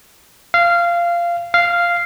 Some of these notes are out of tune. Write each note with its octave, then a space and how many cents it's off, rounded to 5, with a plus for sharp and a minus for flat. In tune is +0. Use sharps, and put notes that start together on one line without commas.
F5 -15
F5 -5